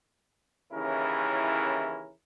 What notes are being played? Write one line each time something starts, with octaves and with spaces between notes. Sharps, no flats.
D#2 C#3 E3 C#4 E4 A#4